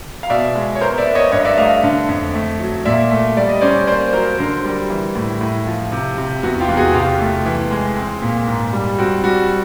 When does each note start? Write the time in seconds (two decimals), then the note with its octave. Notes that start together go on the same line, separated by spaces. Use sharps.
0.23 F5
0.30 B2 D5 E5
0.55 G#3
0.75 C#5
0.81 B3 A#4 C5
0.98 D5 E5
1.07 B3
1.15 C#5 D#5
1.32 G2 C#5 D#5
1.45 D5 E5
1.57 A3 D#5 F5
1.83 D3
2.09 F2
2.34 A3
2.60 F#3
2.85 A#2 D5 E5
3.11 A3
3.37 G3 D5
3.49 D#5
3.61 C#4 C5 D5
3.87 A#3 C5 D5
4.13 F#3 A#4 C5
4.38 D3 A#4 C5
4.65 G3
4.90 E3
5.15 A2
5.41 A2
5.67 F3
5.92 C3
6.18 C3
6.43 E2 F#4
6.60 F4 G4
6.68 E2
6.77 F#4 G#4
6.94 C2 F4 G4
7.20 A3
7.46 E3
7.71 G#3
7.97 C4
8.22 A#2
8.48 G#2
8.73 G3
8.99 C4 F#4
9.24 G3 F#4